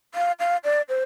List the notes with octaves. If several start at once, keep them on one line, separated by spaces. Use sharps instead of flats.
F5
F5
D5
C5